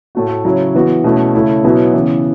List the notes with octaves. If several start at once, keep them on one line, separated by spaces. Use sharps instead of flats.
A2 A3 F#4
C#3 F#3 C#4 E4
E3 B3 F#4
B2 A3 C#4 E4
C#3 A3 C#4 E4
B2 F#3 B3 E4
C#3 E3 B3